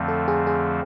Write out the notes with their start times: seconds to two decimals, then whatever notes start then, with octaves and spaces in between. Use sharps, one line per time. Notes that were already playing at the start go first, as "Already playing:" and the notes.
Already playing: F2 D3 F3 A3 C4
0.08 A4
0.28 G#4
0.47 G#4